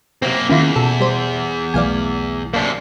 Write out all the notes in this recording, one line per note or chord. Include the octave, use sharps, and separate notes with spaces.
F#2 C3 A#3 C4
E2 D#3 A#3 C#4 E4 F4
B2 A4
G3 C5 D#7
B1 E3 A3 D5 F5 G#5
F#2 C3 A#3 D4